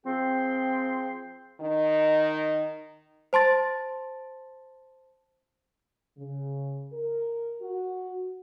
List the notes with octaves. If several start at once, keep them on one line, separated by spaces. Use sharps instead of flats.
F3 C4 G#4 G5 C6
D#3 D#4
C5 A5 C6 A6
C#3
A#4
F#4